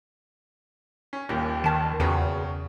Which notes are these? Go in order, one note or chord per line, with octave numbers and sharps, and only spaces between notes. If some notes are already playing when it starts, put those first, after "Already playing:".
C#4
D#1 D#2 G4
D#3 B4 A5
E2 C#3 F#4 B4 G5